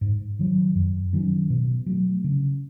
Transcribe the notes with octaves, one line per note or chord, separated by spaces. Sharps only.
G#2
D#3 F#3
F#2
D#3 F#3 C#4
B2
F#3 A3
C#3